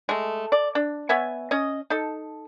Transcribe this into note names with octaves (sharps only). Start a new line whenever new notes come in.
G#3 A3
D5
D4
B3 C#5 E5 G#5
C#4 D#5
D#4 A4